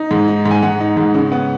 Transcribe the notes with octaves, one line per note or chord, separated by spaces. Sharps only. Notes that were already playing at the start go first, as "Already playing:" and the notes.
Already playing: D#4
G#2
D#4
G#2
G#5
G#2 F#5
D#4
G#2
C#3
B3